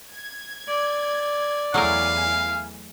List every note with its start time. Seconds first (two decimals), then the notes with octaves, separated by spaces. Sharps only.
0.13 G#6
0.67 D5
1.74 E2 F#3 A3 E4 A#4 F5 G#5